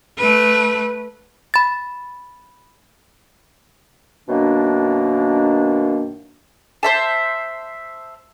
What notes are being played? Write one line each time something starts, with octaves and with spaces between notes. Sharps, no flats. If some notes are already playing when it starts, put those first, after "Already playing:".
A3 B4
B5 A6
F#2 B2 D#3 A#3 D4
C5 E5 A5